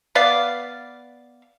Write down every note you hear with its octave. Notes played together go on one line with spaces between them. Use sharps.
B3 D5 F5